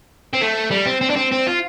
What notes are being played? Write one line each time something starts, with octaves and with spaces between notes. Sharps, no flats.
C4
A3
G3
C4
C4
D4
C4
C4
F4